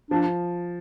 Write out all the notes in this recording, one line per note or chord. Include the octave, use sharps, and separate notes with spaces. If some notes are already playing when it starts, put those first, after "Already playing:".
F3 D4